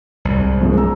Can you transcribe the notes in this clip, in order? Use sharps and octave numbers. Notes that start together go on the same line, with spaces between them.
C2 G#2
F#2 F3 G#3
A#5 E6